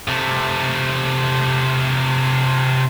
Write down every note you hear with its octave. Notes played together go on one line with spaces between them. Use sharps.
C3 A3